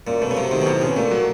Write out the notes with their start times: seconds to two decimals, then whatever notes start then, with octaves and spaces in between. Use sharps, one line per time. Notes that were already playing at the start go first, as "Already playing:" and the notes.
0.07 F#2 A#2
0.21 B2 A3
0.31 C#3
0.37 C3 F#3
0.51 C3 D#3
0.62 B2
0.66 A2 C3
0.82 B2 C#4
0.96 A#2 A3
1.11 F#3